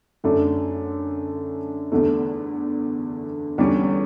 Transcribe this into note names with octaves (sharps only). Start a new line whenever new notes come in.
F#2 D3 A3 D4
E2 D3 A3
E2 D3 G3 C#4